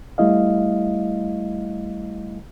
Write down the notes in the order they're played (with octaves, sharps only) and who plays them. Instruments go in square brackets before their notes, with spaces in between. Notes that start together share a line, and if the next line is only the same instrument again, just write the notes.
[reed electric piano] G3 A3 E4 D#5 F5